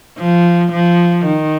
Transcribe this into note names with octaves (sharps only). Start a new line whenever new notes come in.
F3
F3
D#3